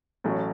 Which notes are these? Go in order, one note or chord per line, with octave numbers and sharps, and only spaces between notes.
A1 A2 F#3